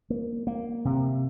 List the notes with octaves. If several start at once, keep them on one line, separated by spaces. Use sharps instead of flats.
A#3
A#3
C3